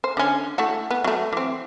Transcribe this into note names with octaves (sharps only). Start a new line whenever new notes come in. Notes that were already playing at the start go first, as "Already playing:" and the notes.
C5
D3 C#4
A3 E4 F#4
B3
F#3 A3
E3 C4